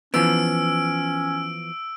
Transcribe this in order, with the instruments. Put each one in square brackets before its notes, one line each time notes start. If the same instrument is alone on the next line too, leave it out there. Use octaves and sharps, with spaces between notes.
[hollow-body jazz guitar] E3 F3 B3 [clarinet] C#4 [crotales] E6 D7